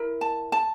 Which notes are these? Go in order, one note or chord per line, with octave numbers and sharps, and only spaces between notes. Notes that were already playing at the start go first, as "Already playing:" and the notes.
Already playing: E4 A#4
A5
A5